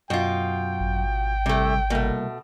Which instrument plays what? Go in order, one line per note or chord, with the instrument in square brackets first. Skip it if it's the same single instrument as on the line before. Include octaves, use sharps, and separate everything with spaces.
[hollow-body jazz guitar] F#2 [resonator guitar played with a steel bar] B2 F4 [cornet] G5
[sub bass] G#1
[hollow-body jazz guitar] C2 [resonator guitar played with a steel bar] C3 A3
[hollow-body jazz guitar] C2 A#3 [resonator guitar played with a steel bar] B2 A3